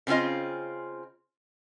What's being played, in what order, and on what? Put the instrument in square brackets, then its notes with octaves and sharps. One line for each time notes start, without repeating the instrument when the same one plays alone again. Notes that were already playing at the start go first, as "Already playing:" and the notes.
[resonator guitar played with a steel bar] C#3 C4 C#4 F4 D#5